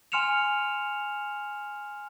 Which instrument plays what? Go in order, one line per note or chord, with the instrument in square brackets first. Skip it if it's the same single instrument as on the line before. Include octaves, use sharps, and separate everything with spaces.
[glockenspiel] G#5 C6 F6 C#7 E7 F7